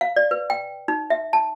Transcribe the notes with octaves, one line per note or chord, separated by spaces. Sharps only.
F5
D5
B4
G5
D#4
E5
A5